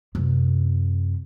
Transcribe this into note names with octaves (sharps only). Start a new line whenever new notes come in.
F#2 C3